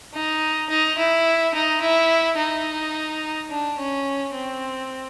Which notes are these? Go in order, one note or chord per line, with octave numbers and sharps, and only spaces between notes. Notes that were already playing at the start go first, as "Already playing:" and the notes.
D#4
D#4
E4
D#4
E4
D#4
D4
C#4
C4